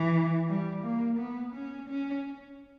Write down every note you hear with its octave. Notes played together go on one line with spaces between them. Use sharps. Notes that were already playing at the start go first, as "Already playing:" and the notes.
Already playing: E3
G3
A#3
B3
C#4
C#4